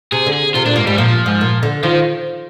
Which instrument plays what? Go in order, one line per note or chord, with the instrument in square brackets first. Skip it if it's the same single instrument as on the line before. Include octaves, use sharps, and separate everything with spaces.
[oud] C3 [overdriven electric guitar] G#4
[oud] D3
[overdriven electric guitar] G#4
[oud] C3 [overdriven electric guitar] F4
[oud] A#2 [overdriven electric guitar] D4
[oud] G#2 [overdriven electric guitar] A#3
[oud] G#2 [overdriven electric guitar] G3
[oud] A#2 [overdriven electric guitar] F3
[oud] G#2
A#2
D3
[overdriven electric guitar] D#3 [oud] F3